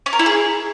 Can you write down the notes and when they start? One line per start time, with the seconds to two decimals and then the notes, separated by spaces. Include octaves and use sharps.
0.06 C#4
0.13 A#4
0.19 E4
0.26 G#4